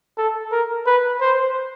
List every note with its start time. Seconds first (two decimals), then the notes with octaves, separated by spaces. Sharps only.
0.18 A4
0.52 A#4
0.87 B4
1.21 C5